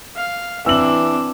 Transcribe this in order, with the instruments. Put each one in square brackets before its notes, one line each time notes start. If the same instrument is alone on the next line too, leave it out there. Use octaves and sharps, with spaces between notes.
[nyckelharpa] F5
[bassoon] E3 [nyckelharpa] C4 D4 [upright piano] E6 F#7